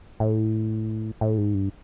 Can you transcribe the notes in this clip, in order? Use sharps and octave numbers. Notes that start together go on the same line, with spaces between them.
A2
A2
G#2
G2